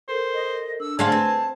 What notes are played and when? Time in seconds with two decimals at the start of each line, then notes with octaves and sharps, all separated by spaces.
0.09 A4 A#4 C5
0.34 D#5
0.80 D4 E6
0.99 D3 A3 D4 G#4 C5 F5 G#5 A5
1.12 C4 B4